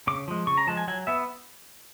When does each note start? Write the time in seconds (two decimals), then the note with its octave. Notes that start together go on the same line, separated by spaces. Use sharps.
0.07 C#3 D6
0.28 F3 G#3
0.47 C#3 C#6
0.57 A#5
0.67 F3 G#3 A5
0.77 G#5
0.88 F#3 G#5
1.07 B3 E5